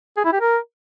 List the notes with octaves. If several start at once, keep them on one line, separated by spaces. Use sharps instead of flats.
G#4
E4
G4
A#4